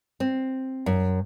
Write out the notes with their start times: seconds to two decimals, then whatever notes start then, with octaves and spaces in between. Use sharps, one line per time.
0.20 C4
0.86 F#2